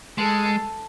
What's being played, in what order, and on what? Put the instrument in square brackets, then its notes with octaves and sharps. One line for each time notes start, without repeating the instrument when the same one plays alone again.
[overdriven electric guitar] G#3 [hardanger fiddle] A4